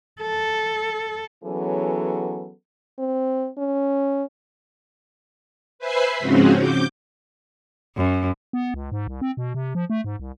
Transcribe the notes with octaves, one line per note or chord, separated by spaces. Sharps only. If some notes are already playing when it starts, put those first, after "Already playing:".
A4
E3 F#3 B3 C#4 G#4 A4
C4
C#4
B4 C5 E5 G#5 B5 C6
G#2 C#3 F3 C4 C#4 F#4
D6 G6
F#2
B3
C#2
G#2
C2
C4
B2
C3
F3
A3
G#2
C2